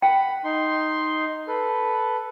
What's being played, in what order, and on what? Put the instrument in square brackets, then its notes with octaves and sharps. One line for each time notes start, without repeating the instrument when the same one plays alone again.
[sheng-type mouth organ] F#5 B5 [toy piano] G5
[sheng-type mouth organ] D#4 C6
A4 B4